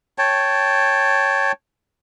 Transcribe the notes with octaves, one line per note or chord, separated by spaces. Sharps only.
C#5 G5 A5